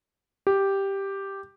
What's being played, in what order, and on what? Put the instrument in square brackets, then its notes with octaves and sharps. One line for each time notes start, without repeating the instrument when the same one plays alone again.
[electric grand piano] G4